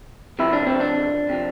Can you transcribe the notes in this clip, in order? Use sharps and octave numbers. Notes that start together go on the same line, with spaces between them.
C3 F3 E4
D4
C4
D4
C3 F3